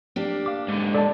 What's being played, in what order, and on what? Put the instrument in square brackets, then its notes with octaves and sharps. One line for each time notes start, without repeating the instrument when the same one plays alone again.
[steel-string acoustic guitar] A#3 D4 G4
[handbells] F5 D6
[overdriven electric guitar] G#2 D3
[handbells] A4 [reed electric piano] D5 A5